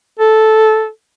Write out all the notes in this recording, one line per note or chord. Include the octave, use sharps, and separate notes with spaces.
A4